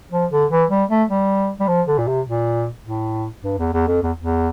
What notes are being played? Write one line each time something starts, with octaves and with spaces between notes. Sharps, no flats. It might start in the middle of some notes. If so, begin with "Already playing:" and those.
F3
D3
E3
G3
A3
G3
G3
F3
D3
A#2
C3
A#2
A2
G2
E2
E2
F2
E2
E2